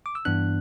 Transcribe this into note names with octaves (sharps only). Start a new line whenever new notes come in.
D6
E6
G2 E3 B3 D4 F#6